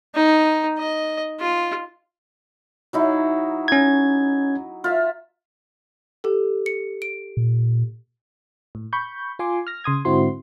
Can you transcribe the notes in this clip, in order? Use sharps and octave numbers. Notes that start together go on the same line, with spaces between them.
D#4
D#5
F4
F#3 D#4 E4
C#4 G#6
F4 E5
G4 A4
C#7
D7
A#2
A2
B5 C#6 G6
F4 G#5 C6 D6
F6 A#6
C#3 C6 D#6 G#6
G#2 D3 C4 E4 F#4 C6